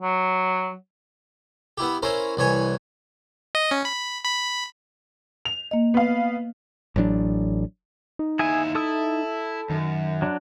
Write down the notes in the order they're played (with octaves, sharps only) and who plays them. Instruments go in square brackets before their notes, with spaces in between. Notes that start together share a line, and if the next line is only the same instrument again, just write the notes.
[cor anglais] F#3
[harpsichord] B3 E4 G4
C#4 E4 A#4 C5
C2 E3 C#5 G#5
[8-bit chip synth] D#5
C#4
B5
B5
[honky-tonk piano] F7
[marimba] A#3 D#5
[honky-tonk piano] B3 F5
[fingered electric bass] A1 F#3 G#3 D4
[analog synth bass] D#4
[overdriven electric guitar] D#2 E4 [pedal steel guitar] G#4 E5 G#5
[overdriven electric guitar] E4 [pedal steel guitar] A4 D#6 E6
[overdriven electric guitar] F#2 [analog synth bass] D#3
[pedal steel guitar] F#3 D4